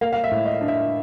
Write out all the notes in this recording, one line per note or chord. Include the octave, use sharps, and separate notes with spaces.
A#3 F5
F5
E5
A2
D#5
D4
E5